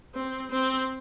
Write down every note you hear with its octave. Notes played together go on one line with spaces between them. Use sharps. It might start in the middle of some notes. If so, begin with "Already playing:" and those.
C4
C4